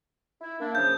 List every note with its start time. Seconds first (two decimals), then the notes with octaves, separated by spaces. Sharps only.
0.41 E4
0.60 A#3 D4 E5
0.75 C#3 F3 G6